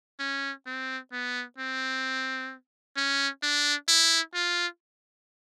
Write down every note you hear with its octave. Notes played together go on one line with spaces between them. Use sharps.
C#4
C4
B3
C4
C#4
D4
E4
F4